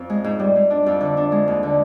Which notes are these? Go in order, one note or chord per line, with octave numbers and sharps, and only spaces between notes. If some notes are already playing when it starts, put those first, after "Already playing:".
Already playing: F2 C4
G#3
G#2
G3
G#2
D4
F2
D3
D4
G#3
D#2
D3